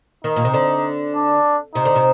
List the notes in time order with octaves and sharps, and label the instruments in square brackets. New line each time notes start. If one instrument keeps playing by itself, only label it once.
[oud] D#3 [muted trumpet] D#4
[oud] A#2
C3
D3
[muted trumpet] D4
[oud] C3 [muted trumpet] D#4
[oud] D3
C3